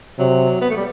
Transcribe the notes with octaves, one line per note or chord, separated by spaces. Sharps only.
C3 F#3
B3
A3
G3